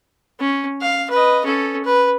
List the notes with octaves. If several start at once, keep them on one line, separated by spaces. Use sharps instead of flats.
C#4
F5
B4 D#5
C#4 A4
B4